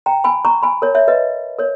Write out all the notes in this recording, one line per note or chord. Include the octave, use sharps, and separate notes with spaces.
G5 A#5
G#5 B5
A#5 C#6
G#5 B5
A#4 C#5
C#5 E5
B4 D#5
A#4 C#5